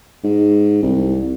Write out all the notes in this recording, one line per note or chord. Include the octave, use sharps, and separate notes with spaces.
G#2
C2